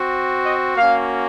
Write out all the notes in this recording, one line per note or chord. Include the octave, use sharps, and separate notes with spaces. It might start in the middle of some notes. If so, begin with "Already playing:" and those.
Already playing: C4 F#4
D#5
A#3 C#4 F#4 F5